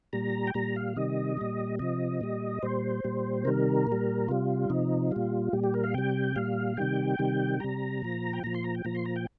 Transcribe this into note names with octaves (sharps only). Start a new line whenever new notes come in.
A#2 G3 A#5
G5
A#2 G3 A#5
F5
C3 D#3 G3 D#5
A#2 G3
C3 F3 D#5
A#2 G3
A#2 G3 C5
A#2 G3
C3 D#3 G3 A#4
A#2
G3
C3 G3 F4
C3 F3 D#4
A#2 G3 F4
A#2 G3 G4
G4
A#4
F5
C3 G3 G5
A#2 G3 F5
C3 D#3 G3 G5
C3 D#3 G3
C3 G3 A#5
A#2 F3
G5
A#2 F3 A#5
C6
A#5
G5
A#2 F3 A#5
C6
A#5
G5